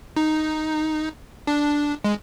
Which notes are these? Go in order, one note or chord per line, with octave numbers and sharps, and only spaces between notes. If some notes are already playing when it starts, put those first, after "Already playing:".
D#4
D4
G#3